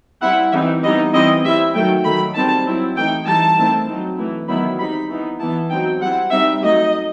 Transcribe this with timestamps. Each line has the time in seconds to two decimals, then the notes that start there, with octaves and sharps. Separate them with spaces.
0.21 G3 C4 E4 F#5
0.52 E3 G3 C4 D#4 E5
0.82 E3 G3 B3 D#4 D#5
1.13 E3 G3 C4 E4 D#5
1.44 G3 C4 E4 E5
1.74 D#3 F#3 A3 G5
2.04 D#3 F#3 A3 B5
2.35 D#3 G3 C4 A5
2.65 F#3 C4 E4
2.95 E3 A3 D#4 G5
3.26 E3 G3 D#4 A5
3.57 D#3 A3 C4 E4
3.87 F#3 C4 D#4
4.17 E3 A3 E4
4.48 D#3 F#3 B3 E4 B5
4.78 G3 C4 D#4 B5
5.09 E3 B3 D#4
5.39 E3 B3 E4 A5
5.70 F#3 C4 D#4 G5
6.00 G3 C4 E4 F#5
6.30 G3 C4 D#4 E5
6.61 F#3 A3 D#4 D#5